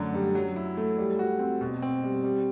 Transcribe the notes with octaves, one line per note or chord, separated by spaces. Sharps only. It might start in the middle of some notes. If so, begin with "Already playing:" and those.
Already playing: F#2 D3 A3
G3
F#3
E4
A3
G3
F#4
C4
B2
C4
G3
G3